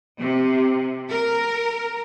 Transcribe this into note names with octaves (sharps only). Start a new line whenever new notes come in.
C3
A#4